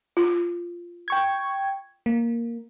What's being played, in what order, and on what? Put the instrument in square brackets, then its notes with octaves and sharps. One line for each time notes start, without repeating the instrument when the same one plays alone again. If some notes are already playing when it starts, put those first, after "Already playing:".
[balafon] F4
[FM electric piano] G5 C#6 G#6
A#3